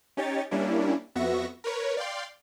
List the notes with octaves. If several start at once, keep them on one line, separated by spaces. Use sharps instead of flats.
C#4 D#4 G4 C#5 A6
G3 A#3 C#4 D4 E4
F2 B3 F#4 E5 C#6 A#6
A#4 B4 C#5
D5 F5 G5 C6